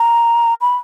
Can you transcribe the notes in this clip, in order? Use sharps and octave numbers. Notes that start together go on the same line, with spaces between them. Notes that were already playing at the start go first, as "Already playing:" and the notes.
Already playing: A#5
B5